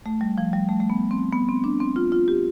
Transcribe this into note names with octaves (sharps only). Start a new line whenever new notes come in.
A3
G3
F3
G3
A3
A3
B3
C4
B3
C4
D4
C4
F4
F4
G4